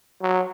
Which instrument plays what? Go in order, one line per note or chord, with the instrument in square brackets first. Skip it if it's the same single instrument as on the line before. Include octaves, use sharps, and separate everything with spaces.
[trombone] F#3